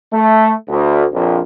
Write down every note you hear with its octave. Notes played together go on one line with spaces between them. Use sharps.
A3
D2
A#1 F2